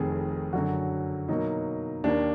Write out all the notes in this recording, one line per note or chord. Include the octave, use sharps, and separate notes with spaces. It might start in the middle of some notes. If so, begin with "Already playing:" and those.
Already playing: F1 F2 D#3 G#4
F#2 D3 F#3 F#4
B2 F#3 A#3 D#4
D#2 D#3 A#3 D4